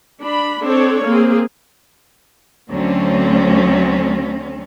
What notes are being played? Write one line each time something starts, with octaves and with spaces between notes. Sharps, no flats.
D4 B5
C4 D4 A4 C#5
A#3 C4 G#4
D2 D3 F#3 C4 C#4